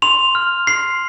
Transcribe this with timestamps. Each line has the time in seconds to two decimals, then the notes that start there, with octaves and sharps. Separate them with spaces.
0.02 C6 F7
0.35 F6
0.67 C6 C7